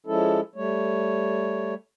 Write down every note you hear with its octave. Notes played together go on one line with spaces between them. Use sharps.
F3 G#3 C#4 E4 A4
G3 A3 C#5